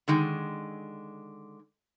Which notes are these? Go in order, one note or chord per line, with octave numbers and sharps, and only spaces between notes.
D3 D#3 G#3